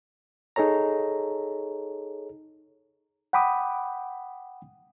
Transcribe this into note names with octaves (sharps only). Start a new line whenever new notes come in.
D#4 G#4 A4 C#5 A#5
F#5 G5 B5 D6 D#6